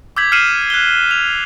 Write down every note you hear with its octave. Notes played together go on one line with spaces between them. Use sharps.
D6 E6 G6 G#6 B6 F#7
F6 C7 C#7 D#7 E7 F#7
F#6 G7
F7